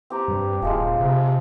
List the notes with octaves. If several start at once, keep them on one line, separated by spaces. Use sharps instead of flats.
C4 G4 A#5
G2
D#1 F3 G#3 F4
C3